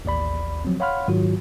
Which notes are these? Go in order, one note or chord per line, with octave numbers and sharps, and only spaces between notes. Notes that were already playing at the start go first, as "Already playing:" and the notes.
A1 D#2 D5 B5
F3 F#3 C4
C#5 F5 F#5 B5 C6 F6
G#2 D#3 F#3 F4 F#4